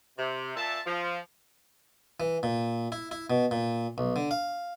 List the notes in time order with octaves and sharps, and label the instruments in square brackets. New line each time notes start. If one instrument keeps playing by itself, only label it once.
[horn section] C3
A#2 E5 A5
F3
[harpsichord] E3
A#2
E4
E4
B2
A#2
B1
D3
F5